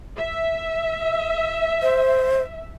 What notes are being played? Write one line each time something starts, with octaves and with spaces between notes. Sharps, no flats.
E5
C5